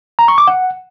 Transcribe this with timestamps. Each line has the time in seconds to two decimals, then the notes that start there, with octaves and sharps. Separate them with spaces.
0.19 A#5
0.28 C#6
0.38 D6
0.47 F#5